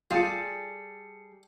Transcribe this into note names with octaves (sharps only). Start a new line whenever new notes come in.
G3 F4 G#4 A4 C7 C#7